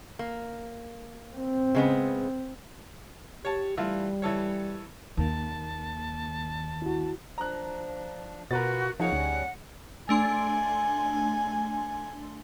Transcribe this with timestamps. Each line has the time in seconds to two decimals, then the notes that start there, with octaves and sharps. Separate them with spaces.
0.19 A#3
1.37 C4
1.75 C#3 G#3 B3
3.45 G4 C#5 A5
3.77 E3 G3 A3 F4
4.22 E3 A4 C#5
5.17 D#2 D#3 A#3 A5
6.82 E4 F#4
7.38 F3 D4 A#5 F#6
8.51 B2 B3 F4 F#4 A#4 B4 A6
9.00 C#3 F3 A#3 D#4 G#4 C#5 F5 F#5
9.13 D2 G3 C#4
10.09 A3 D4 G#5 C6